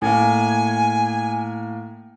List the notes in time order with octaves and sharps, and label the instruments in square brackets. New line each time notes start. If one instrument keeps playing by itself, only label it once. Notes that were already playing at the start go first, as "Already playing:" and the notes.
[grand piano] A2 A#3 [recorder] G#5